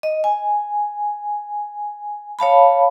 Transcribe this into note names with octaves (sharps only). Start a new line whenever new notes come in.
D#5
G#5
C#5 F5 A5 B5